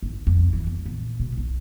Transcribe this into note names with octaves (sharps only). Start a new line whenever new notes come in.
G#1
F2
E3
B3
A#2
B2
B1